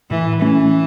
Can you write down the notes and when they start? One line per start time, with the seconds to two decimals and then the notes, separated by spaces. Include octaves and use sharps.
0.10 A2 E3
0.41 E3 A3 C#4